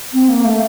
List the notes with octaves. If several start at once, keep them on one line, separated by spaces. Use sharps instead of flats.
C4
A#3
A3